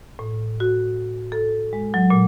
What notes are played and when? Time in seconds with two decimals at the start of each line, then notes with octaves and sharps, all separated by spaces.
0.19 A2
0.60 F#4
1.32 A4
1.73 G#3
1.94 F#3
2.10 A#2